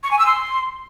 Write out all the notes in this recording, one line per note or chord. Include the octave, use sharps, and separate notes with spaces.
C#6
G#5
E6
C6